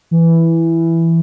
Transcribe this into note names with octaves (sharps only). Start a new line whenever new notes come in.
E3